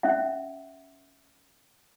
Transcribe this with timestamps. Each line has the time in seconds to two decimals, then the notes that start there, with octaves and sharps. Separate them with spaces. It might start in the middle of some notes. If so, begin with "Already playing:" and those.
0.03 C#4 E5 F#5